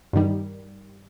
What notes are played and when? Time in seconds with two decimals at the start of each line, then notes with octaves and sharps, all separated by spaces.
0.13 G2 D#3 G3